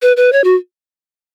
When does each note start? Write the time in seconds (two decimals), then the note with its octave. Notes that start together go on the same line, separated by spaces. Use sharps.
0.02 B4
0.17 B4
0.33 C#5
0.44 F#4